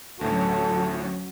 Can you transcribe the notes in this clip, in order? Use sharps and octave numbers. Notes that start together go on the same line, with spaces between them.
D2 A2 F#3 C#4 F#4 A4